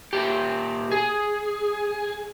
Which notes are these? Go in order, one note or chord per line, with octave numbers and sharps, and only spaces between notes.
A#2 G4
G#4